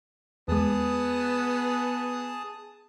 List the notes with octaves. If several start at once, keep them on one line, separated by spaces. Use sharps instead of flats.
E2 G#3 B3 G#4 A5 D#6